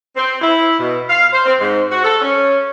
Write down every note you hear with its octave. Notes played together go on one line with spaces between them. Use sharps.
C4
E4
B2
F5
C5
C4
G#2
F#4
A4
C#4